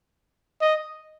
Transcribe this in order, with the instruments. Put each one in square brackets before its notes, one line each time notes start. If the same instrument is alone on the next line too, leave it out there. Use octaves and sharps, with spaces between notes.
[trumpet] D#5